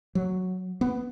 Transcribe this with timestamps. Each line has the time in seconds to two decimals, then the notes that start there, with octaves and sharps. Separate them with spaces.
0.15 F#3
0.81 B3